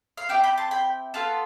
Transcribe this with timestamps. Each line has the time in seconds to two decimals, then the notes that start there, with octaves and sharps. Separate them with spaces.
0.17 F5
0.29 C4 E4 G4 E5 G5
0.44 G5 B5
0.58 A5 C6
0.71 G5 B5
1.14 B3 F4 A4 F5 A5